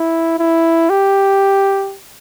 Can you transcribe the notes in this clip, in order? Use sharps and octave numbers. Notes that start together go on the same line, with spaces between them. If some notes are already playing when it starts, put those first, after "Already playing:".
Already playing: E4
E4
G4